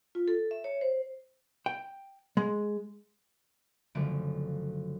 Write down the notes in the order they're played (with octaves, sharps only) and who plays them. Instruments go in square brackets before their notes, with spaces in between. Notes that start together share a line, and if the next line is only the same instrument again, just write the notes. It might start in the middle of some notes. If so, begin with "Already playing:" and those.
[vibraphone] F4
A4
E5
C#5
C5
[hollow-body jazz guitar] G5
G#3
[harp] F#1 D3 F3 A3 D7